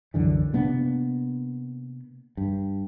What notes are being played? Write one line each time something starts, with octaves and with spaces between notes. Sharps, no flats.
C2 F#2 D3 E3
C3 A#3 B3 D4
G2